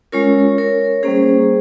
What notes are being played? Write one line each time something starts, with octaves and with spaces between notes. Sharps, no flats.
G#3 C#4 F4 A#4 C#5
A#4 C#5
G3 A#3 C#4 G#4 C5